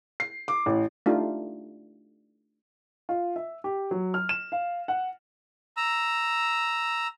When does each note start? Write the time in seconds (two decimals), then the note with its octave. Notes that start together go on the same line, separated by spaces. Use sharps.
0.20 C7
0.48 D6
0.66 A1
1.06 A3 D4 D#4 F4 G4
3.09 F4
3.36 E5
3.64 G4
3.91 F#3
4.14 F6
4.29 E7
4.52 F5
4.88 F#5
5.77 A#5 E6